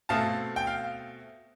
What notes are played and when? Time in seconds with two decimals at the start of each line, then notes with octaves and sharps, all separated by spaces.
0.09 B2 A3 C4 F5 A5
0.56 G5
0.67 F5